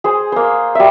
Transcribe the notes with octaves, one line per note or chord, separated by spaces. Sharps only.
G#4 C5
A#3 C5
G3 E5